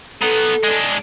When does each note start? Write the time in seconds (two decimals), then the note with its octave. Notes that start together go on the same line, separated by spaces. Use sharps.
0.22 B3 D#4 A4
0.63 G#3 D4